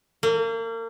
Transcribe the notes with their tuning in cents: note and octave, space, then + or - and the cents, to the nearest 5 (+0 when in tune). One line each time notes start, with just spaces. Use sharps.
A#3 -35